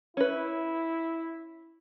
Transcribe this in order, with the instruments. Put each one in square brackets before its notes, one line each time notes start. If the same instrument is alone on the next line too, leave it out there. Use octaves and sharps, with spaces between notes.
[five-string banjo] C#4 B4 [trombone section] E4